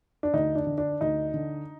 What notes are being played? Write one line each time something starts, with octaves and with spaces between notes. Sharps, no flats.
D4
D2 D#4
D4
D3
D4
D2 D#4
D3